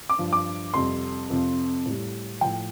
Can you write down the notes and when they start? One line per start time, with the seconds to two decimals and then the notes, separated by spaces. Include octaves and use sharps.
0.09 D6
0.18 G2 F3
0.33 D6
0.74 F2 C3 G3 C6
1.30 F2 C3 F3
1.86 A2 G3
2.41 A2 F3 G5